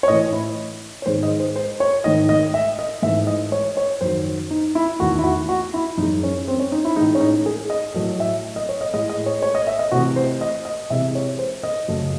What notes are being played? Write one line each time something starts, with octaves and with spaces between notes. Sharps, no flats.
C#5
A2 E3 A3 D#5
E4
C#5
G#2 D#3 G#3 C5
D#5
C5
C5
C#5
G#2 D#3 A3 D#5
D#5
E5
D#5
G#2 E3 A3 E5
D#5
C#5
C#5
F#2 D#3 F#3 C5
D#4
E4
E2 D#3 A3 F#4
E4
F#4
F#4
E4
F#2 E3 G#3 D#4
C#4
C4
C#4
D#4
E4
A2 E3 G#3 D#4
C#4
D#4
G#4
D#5
A2 F#3 A3 D#5
E5
D#5
C#5
D#5
A2 G#3 D#5
D#5
C#5
C#5
D#5
E5
D#5
C3 E3 A3 F#4
C5
D#5
D#5
C3 E3 G#3 E5
C#5
C5
D#5
F#2 C#3 F#3 A3